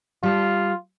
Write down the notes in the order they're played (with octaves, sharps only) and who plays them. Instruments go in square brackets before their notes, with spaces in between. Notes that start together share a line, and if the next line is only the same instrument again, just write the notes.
[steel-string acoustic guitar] G3 A5 [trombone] F4